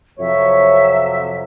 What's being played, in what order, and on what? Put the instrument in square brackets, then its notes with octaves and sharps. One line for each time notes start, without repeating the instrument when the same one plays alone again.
[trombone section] F2 C3 F#3 [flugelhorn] C#5 [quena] E5